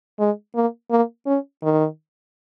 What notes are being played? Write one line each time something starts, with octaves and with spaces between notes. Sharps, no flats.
G#3
A#3
A#3
C#4
D#3